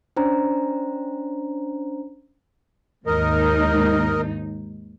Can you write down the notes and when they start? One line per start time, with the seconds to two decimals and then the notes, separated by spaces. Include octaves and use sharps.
0.16 C#4 D4 C5 A#5
3.06 D#2 G#2 D#4 A#4 D#5